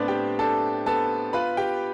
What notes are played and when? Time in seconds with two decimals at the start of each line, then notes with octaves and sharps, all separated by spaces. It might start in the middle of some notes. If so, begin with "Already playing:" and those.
Already playing: A2 B3 C4 D4 C5 D5
0.08 G4 G5
0.39 D4 A4 A5
0.86 B3 A4 A5
1.33 F4 B4 B5
1.57 G4 G5